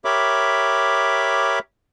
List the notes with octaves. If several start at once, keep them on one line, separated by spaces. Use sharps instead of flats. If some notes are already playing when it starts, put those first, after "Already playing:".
G4 A#4 C#5 E5 B5 D6